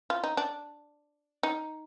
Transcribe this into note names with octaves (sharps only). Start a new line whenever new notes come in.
F4
D#4
D4
D#4